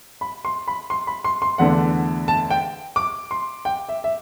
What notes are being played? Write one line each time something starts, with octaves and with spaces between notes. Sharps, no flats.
B5
C6
B5
C6
B5
C6
C6
E2 D3 A3 D4 F#5
A5
G5
D6
C6
G5
E5
E5